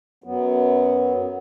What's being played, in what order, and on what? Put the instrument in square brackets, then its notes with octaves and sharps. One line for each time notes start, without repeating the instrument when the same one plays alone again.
[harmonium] F#2 F#3 B3